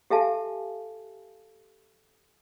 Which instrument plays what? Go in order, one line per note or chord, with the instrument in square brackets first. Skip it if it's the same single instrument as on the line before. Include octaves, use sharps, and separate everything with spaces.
[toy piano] G4 A4 E5 F5 G#5 A5